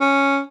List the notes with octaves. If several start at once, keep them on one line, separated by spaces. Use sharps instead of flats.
C#4